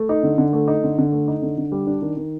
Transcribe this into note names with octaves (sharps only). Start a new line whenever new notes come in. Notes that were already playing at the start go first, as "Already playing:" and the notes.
Already playing: A3
D#4
D3
D3
A3
D#4
D3
D3
A3
D#4
D3
D3
G3
D4
D#3
D#3